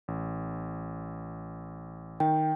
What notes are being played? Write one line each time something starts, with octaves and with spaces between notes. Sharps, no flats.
A1
D#3 G5